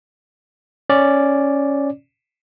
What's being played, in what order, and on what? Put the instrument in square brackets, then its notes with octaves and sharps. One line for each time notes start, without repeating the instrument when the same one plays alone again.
[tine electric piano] C#4 D5